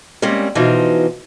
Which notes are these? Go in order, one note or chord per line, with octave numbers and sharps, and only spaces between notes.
G3 G#3 A#3 C4 C#4
B2 E3 F3 D#4 F4 F#4